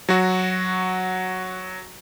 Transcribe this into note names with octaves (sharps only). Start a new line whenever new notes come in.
F#3 F#4